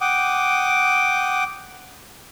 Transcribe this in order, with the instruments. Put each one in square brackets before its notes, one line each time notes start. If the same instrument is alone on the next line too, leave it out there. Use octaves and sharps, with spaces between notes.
[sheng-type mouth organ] F#5 G5 D6 D#6